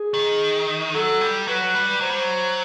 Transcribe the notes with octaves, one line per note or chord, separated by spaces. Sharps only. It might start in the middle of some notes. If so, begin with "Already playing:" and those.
Already playing: G#4
D#3
F#3 A4
G3
F#3 B4
G3
F#3 C5
G3
F#3